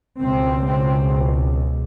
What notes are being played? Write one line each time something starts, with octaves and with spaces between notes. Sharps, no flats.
C#2 B2 C4
C4